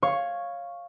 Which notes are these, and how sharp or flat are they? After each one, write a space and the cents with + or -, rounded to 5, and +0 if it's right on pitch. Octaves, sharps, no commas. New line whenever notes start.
C#5 +0 F5 +0 C#6 -5